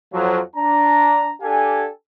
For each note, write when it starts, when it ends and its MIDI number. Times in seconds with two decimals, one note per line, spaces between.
0.13 0.40 41
0.13 0.40 53
0.13 0.40 54
0.56 1.33 62
0.56 1.33 82
1.42 1.87 62
1.42 1.87 67
1.42 1.87 69
1.42 1.87 77
1.42 1.87 80